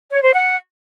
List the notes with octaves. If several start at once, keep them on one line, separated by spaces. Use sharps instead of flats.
C#5
C5
F#5